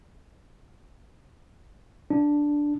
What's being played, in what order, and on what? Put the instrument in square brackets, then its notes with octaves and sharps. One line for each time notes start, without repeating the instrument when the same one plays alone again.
[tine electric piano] D4